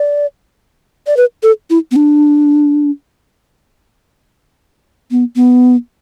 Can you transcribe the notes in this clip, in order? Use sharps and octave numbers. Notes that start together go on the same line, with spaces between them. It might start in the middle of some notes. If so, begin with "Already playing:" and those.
Already playing: D5
D5
B4
A4
E4
B3
D4
B3
B3